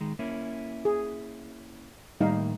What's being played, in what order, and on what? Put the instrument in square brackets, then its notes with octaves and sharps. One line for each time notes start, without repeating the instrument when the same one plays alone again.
[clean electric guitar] D#3 G#3
A#3 C#4 E4
[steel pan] G#4
[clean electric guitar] A2 D#3 A#3 [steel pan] G3 D#4 F5